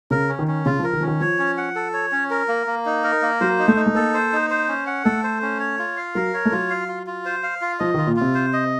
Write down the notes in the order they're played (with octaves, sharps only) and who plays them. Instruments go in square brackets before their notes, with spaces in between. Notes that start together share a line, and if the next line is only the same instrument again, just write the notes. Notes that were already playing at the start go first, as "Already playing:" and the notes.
[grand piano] C#3 [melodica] A#4
[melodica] C#4
[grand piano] D#3
[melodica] C#4
[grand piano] C#3 [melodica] F4
[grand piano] F3 [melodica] A#4
[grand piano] D#3
[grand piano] F3 [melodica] C#4
[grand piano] D#3
[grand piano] F3 [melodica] C#5
[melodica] C#4
F#5
A4
C#5
C#4
A#4
A#3
A#3
D#4
A#4
A#3
[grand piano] F#3 [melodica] C5
[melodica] D#4
[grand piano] A3
[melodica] D#4
[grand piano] A3
[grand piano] A#3 [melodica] A4
[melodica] C5
D#4
C5
C#4
F#5
[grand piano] A3 [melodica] A4
[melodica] C5
C#4
C#5
F4
F5
[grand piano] F#3 [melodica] A#4
[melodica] C#5
[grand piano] A3
[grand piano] F#3 [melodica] F4
[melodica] F5
F4
F4
C5
F5
F4
[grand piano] F3 [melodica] D#5
[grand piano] D#3 [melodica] F4
[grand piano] A#2
[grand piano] C3 [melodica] F4
[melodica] C5
D#5